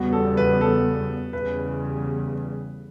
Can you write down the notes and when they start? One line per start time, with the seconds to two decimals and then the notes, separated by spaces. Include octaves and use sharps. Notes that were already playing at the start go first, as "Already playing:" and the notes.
Already playing: E2 C#3 G3 B3 F#4
0.13 A4
0.37 B4
0.61 A4
1.33 E2 C#3 G3 B4